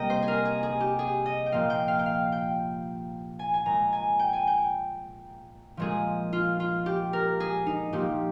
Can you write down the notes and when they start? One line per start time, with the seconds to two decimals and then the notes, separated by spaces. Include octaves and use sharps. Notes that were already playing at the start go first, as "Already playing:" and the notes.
Already playing: C3 G3 A#3 D#5 G5 A#5
0.10 C5
0.22 G#4
0.28 A#4
0.45 G#4
0.63 G#4
0.80 G4
0.99 G#4
1.26 D#5
1.46 G5
1.52 A#2 F3 A#3 F5
1.70 G5
1.88 F5
1.99 G5
2.06 F5
2.32 G5
3.39 G#5
3.54 G#5
3.66 A#2 G#3 A#5
3.93 G#5
4.19 G5
4.33 G#5
4.47 G5
5.77 A#2 F3 G#3 G#4
6.33 F4
6.60 F4
6.86 G4
7.13 A#4
7.40 G#4
7.66 D#4
7.93 A#2 F3 A#3 G4